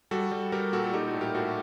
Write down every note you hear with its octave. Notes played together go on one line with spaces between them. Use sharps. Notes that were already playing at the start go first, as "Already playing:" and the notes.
G3 F#4 A4
G3
G3 G4 A#4
A#2 F#4 A4
A4
G3 D#4 G4
F#4 A4
A2
G4 A#4
A2 F#4 A4